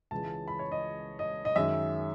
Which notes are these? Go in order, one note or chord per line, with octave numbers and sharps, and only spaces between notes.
C#2 C#3 E3 G#3 A5
B5
C#5
D#5
D#5
D#5
F#2 D#3 G#3 D#4 E5